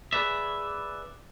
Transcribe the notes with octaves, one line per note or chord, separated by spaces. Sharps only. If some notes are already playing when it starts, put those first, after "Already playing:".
G#4 B4 D5 E5